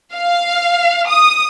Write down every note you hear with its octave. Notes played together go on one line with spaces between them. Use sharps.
F5
D#6